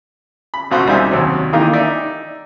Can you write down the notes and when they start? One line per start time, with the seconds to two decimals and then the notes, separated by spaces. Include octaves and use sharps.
0.54 B5
0.71 A1 B2 F4 F#4 C5 F#6
0.87 C2 G3 D#4 C5 E5 G#5
1.11 D#2 C3 F#3
1.53 D#3 E3 A#3 D#4 F4 G4
1.73 D#4 D5 E5